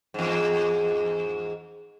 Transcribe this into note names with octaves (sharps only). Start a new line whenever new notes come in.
E2 G#2